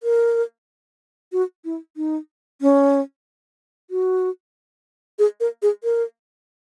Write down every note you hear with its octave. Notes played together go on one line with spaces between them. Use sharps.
A#4
F#4
E4
D#4
C#4
F#4
G#4
A#4
G#4
A#4